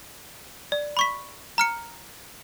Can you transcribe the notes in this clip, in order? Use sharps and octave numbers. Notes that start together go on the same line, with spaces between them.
D5
B5 C#6 B6
A#5 F6 C#7